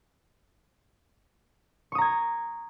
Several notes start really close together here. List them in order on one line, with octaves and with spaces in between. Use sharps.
C#6 D#6 A#5 G#6